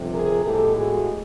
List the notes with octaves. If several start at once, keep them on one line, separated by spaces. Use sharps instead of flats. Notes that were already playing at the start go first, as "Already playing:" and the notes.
Already playing: G1 F2 C3
G#4 A#4
A2 E3 G#3 B3 G4 A4
F#4 G#4